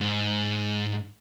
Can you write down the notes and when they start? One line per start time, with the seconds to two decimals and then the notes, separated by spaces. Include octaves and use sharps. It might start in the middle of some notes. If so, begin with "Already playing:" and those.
0.01 G#2